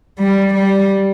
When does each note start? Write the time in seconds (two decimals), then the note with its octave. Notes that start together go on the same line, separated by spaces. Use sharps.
0.19 G3
0.54 G3